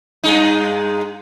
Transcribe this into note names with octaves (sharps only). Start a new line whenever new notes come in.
G2 G#3 D#4